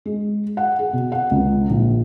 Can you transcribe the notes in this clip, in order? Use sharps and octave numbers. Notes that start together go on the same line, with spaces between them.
G#3
F#5
G#4
B2
F#5
C#2
A#1